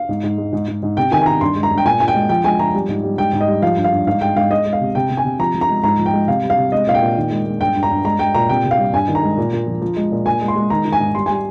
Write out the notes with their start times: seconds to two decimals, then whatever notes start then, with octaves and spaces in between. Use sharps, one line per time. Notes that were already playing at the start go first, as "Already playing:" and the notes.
Already playing: F5
0.09 G#2
0.23 G#2
0.38 G#3
0.53 G#2
0.68 G#2
0.83 G#2
0.97 C3 G5
1.11 D#3 G#5
1.22 G#5
1.26 D#3 A#5
1.41 G2 C6
1.56 G#3
1.63 A#5
1.71 G2
1.78 G5
1.85 A#2 G#5
2.00 A#2 G#5
2.08 G5
2.15 G#3
2.29 F3 G5
2.44 G#3 G#5
2.59 F3 A#5
2.74 G3
2.89 G#2
3.04 G3
3.18 G#2 G5
3.33 G#2
3.41 D#5
3.47 G3
3.62 F3 F5
3.77 G2
3.84 F5
3.92 G2
4.07 G#2 F5
4.21 G#3 G5
4.36 G#2 F5
4.51 G#3 D#5
4.66 G#3
4.73 F5
4.81 C3
4.95 C3 G5
5.10 C3
5.17 G#5
5.25 C3
5.39 F3 A#5
5.54 F3
5.61 A#5
5.69 G#3
5.84 G#2 A#5
5.99 F3
6.06 G5
6.13 G#3
6.28 C3 F5
6.43 G3
6.50 F5
6.58 C3
6.72 G#3 D#5
6.87 A#2 F5
6.94 G5
7.02 A#2
7.16 D#3
7.31 G#3
7.46 G#3
7.60 G2 G5
7.76 G2
7.83 A#5
7.90 G2
8.05 G#3 A#5
8.19 G#3 G5
8.34 A#2 A#5
8.49 C3 G5
8.64 C3
8.71 F5
8.78 G3
8.93 G2 G#5
9.08 D#3
9.15 A#5
9.23 G#3
9.37 A#2
9.53 A#2
9.67 F3
9.82 F3
9.96 G#3
10.12 A#2
10.26 A#2 G#5
10.41 G#3
10.48 C6
10.56 G#3
10.70 D#3 A#5
10.85 D#3
10.93 G#5
11.00 G#2
11.15 G3 C6
11.26 G3 G#5